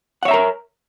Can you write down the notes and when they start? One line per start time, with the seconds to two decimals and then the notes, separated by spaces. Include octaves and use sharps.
0.23 F#5
0.25 C#5
0.28 E5
0.31 A#5
0.34 A#4